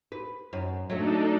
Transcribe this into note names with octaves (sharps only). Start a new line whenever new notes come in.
B4
F#2
F#3 A3 D4 D#4 A4